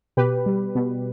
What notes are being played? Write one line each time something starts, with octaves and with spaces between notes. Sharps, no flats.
B2 G4 B4
G3
B2